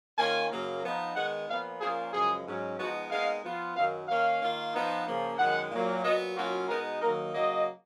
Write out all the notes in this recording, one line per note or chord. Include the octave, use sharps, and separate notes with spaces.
D#3 A#3 C#4 F4 G#5
F#2 C#3 F#3 A#3
F3 B3 D#4
D#3 G#3 B3 F#5
A#2 F3 B3 F5
A#2 F3 A#3 C#4 F4 G#4
F#2 C#3 F3 G#3 G#4
G#2 F#3 C#4
F3 G#3 B3 D#4 F#4
A#2 G#3 B3 D#4 F5
F3 B3 F4
F#2 D#3 F#3 F5
D#3 A#3 C#4 F5
D#3 A#3 F4
F3 B3 D#4
C#3 F3 A#3
F#2 D#3 G#3 F#5
A#2 F#3 A#3
A#2 F#3 B3 D#5
B2 F#3 A#3 C#4 F4 F#4
B2 G#3 B3 D#4 A#4
D#3 F#3 A#3 D#4 A#4
C#3 F#3 A#3 D#5